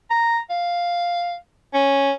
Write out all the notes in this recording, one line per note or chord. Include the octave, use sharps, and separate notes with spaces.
A#5
F5
C#4